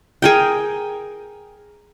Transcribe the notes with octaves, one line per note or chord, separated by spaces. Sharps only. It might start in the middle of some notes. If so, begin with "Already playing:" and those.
G#4 A#4 G5